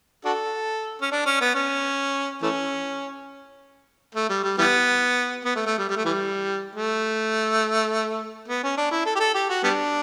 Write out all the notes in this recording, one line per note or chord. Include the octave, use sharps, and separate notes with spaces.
D4 F#4 A4
C#4
D4
C#4
B3
C#4
E3 A3 C#4
A3
G3
G3
E3 G3 B3
B3
A3
A3
G3
G3
A3
E3 G3
A3
B3
C#4
D4
E4
A4
G4
A4
G4
F#4
G3 B3 D4